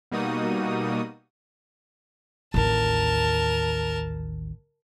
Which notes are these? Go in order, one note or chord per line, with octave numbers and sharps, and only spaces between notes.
B2 G3 A#3 D#4 F#4 D#6
A1 D#2 A#4 A5